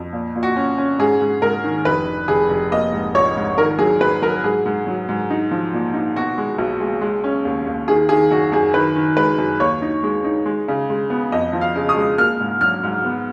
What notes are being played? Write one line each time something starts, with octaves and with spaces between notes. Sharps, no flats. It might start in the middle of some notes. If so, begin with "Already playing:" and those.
Already playing: F2
A#2
A#2
F#4
C#4
C#4
G#2 G#4
G#2
G#2 A#4
D#3
F1 B4
F1
F1 G#4
F1
A#3 D#5
G#2
A#1 C#5
G#2
D#3 A#4
F#3 G#4
F#3 B4
F#3 A#4
G#2 G#4
G#2
F#3
G#2
D#4
F3
A#2
D#4
B2 F#4
G#3
B1
G#3
G#3
C#4
D#2
D#2
D#3 G#4
D#3 G#4
F#2 F#4
F#2 G#4
D#3 B4
D#3
G#3 B4
F#2
D#2 C#5
D#4
G#3
D#4
G#3
C#3
G#3
B3
F2 D#5
F3
F5
C#3
D#6
G#3
A#3 F6
G#2
F#3 F6
G#2
B3